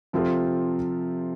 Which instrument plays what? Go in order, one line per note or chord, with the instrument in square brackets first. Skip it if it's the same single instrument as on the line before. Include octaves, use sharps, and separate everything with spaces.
[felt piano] C3 F3 C4 F4 A4